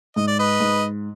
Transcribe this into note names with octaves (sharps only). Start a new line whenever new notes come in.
G#2 D#5
D5
B4 D#5
G#2